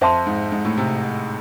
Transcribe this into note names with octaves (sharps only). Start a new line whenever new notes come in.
F2 C5 E5 A5 C6
G#2
G#2
A2
C3